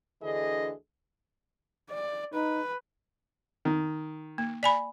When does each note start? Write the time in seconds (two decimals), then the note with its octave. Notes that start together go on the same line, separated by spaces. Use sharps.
0.22 D2 D3 E3 G#4 A4 D#5
1.90 D5
2.34 D#4 B4
3.65 D#3
4.38 A#3
4.63 D5 G#5 B5